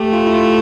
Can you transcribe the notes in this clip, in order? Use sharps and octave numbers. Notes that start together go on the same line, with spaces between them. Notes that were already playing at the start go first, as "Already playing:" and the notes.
Already playing: A3 G4
F4
E4
F4